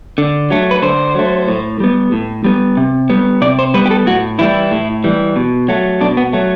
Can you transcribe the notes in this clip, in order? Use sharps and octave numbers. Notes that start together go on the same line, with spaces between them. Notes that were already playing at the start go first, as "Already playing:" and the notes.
D3
F#3 A3
B4
D3 C5
F#3 A3
A2
G3 B3
A2
G3 B3
C3
G3 B3
C3 D5
C5
G3 B3 B4
G4
A4
A2 F#4
E3 G3 E4
A2
E3 G3
B2
F#3 A3
B2 D4
B3
F#3 A3